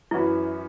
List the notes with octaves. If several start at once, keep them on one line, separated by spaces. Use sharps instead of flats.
F#2 E3 C#4 E4 F#4 B4